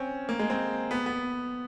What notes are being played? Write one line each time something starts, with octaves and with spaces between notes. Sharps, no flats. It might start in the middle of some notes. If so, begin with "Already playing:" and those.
Already playing: C4 C#4
A#3
G#3
C4
B3
B3